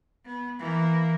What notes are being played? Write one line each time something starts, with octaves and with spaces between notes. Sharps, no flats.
B3
E3 A#3